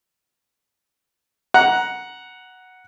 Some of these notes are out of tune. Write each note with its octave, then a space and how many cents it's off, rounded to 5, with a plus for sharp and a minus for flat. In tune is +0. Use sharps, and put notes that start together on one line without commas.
F#5 +0 A#5 +20